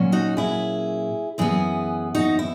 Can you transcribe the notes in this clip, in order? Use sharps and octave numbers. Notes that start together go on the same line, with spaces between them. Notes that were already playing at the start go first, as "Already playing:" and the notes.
Already playing: A#2 F#3 C#4
D#4 F#4
E4 G#4
F#2 E3 B3 E4 G#4
D#4 F#4
E4